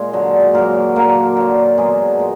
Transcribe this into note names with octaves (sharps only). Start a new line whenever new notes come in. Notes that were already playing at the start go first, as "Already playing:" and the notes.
Already playing: A#2 G#3 G#4
D3 F#3
A#2 F#3 A#3 A#4
A#2 F#3 A#3 A#4
D3 F#3
B2 F#3 G#3 G#4
A#2